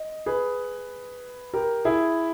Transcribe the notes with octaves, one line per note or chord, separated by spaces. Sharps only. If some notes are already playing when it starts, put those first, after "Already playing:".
Already playing: D#5
G#4 B4
G4 A#4
E4 G#4